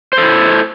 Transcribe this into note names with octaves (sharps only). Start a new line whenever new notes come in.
E4 A4 C5